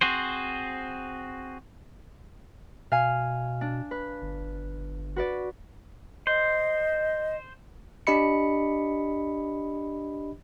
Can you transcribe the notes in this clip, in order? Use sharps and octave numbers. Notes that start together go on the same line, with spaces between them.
C4 F#4 G#4 C5
B2 F5 G#5
D4
B4
G1
F#4 B4 D5
C5 D#5
D4 G4 D#5 B5 C#7